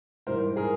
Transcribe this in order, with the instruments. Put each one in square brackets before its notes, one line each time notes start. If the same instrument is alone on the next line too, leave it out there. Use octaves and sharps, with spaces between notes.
[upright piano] G#2 E3 G3 A#4 C5
G#4 A#4